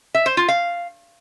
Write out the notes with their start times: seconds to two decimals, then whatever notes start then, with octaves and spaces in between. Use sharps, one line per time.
0.15 E5
0.26 C5
0.37 F4
0.48 F5